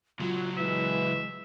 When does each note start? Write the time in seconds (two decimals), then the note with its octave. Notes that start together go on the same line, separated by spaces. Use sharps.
0.20 C#2 F#3 F4
0.57 E3 G#3 E5